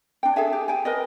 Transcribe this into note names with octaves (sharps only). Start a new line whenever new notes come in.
D4 G5
G#4 A4 E5 G#5
G4
G5 G#5
A#4 B4 D#5